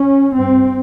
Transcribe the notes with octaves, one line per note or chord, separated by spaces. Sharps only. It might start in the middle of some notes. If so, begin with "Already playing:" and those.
Already playing: C#4
G2 C4